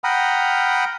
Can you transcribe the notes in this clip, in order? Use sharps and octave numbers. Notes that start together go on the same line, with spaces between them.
F#5 G5 A#5 B5 D#6 F6